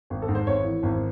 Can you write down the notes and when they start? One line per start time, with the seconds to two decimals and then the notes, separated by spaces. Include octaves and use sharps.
0.10 G#1
0.22 A4
0.28 G#2
0.35 C5
0.47 G#1 C#5
0.65 E3
0.83 G#1